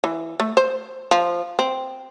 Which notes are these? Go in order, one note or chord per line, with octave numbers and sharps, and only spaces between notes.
E3
A3
C5
F3
C4